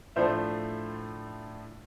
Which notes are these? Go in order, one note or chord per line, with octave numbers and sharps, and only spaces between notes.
A2 F3 A3 D4 C5 E5